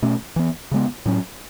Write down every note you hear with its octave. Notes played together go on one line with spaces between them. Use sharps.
B2 A3 C#4
E3 B3
C#3 G#3 B3
A2 F#3 C#4